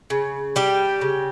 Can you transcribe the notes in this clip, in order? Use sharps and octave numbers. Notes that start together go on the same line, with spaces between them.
C#3
G3 G4
C#3